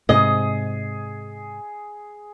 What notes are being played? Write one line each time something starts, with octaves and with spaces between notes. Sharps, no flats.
G#2 C3 G#4 D#5